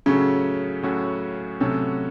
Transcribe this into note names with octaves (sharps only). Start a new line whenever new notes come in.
A2 C#3 F#3 C#4 F#4 A4
A2 F#3 C#4 F#4 A4
A2 C3 F#3 C#4 F#4 A4